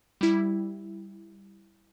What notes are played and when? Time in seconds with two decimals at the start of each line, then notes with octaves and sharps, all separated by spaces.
0.21 G3 E4